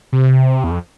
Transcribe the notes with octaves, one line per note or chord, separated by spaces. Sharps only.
C3
E2
F2